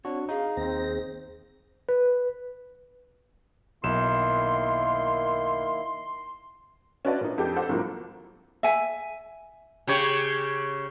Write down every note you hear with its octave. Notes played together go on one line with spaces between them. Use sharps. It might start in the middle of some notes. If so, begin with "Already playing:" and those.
C4 D4 F#4 C#5
D#4 G#4 F5
D#2 C4 C5 A#6
B4
B1 D#3 A#3 E4 C6 E7
C#4 F#4 B4 D5 E5 A5
A#2 D#4
F2 G4 A4 G6
G4 A4 C5 F#5
C2 A2 F3 F#3 A#3
E5 G#5
C#3 G4 C#5